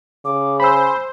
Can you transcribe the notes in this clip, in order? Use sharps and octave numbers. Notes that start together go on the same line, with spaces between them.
C#3 D6
C5 G#5 B5 E6